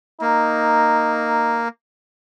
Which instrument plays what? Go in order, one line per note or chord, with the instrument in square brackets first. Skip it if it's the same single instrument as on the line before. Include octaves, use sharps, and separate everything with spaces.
[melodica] A#3 [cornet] D#4